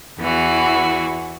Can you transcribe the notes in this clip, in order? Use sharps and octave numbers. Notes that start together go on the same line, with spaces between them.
E2 E3 F#4